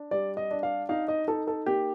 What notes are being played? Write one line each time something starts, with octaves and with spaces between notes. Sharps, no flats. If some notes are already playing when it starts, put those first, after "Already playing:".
Already playing: D4
G3 D5
D#5
D4
F5
D#4 F5
D#5
D#4 A4
A4
A#3 G4